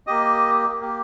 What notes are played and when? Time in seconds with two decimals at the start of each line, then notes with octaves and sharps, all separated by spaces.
0.07 A#3 G4 D#5 D#6
0.80 A#3 G4